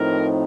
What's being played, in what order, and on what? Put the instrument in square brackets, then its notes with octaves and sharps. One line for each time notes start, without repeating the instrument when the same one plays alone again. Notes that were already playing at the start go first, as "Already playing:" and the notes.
Already playing: [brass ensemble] A2 F3 C4 D#4 A#4